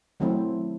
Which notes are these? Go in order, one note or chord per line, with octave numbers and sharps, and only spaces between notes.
D#3 F#3 A3 C4 E4